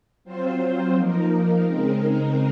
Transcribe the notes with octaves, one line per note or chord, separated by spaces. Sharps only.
F#3 C4 F4 C5
F3 A#3 D#4 A#4
C#3 G#3 C4 D#4 A#4